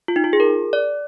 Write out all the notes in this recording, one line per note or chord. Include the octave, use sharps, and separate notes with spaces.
F4
D#4
F4
G#4
A#4
D5